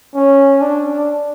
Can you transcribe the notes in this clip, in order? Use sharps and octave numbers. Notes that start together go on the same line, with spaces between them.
C#4
D4